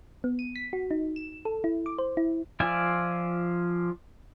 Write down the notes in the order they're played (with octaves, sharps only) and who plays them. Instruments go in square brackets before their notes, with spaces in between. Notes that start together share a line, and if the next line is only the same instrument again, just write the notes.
[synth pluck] B3
D#7
B6
F#4
D#4
E7
A4
E4
D6
C5
E4
[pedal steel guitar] F3 F4 D5 E5 G#5